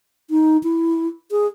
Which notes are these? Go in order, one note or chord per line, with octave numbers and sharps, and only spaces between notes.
D#4
E4
G#4